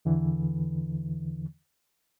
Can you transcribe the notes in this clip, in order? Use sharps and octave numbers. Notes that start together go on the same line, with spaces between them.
E2 D3 E3